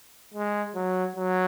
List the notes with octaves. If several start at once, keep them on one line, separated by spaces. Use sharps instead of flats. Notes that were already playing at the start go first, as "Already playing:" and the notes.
G#3
F#3
F#3